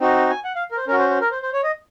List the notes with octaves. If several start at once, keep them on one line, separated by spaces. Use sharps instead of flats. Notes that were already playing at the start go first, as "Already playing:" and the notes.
C4 D#4 F#4
G#5
F#5
F5
A#4
C5
C#4 F#4 A#4
C5
C5
A#4
C5
C5
C#5
D#5